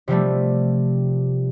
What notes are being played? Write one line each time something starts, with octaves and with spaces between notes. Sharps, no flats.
C3 F3 G3 A3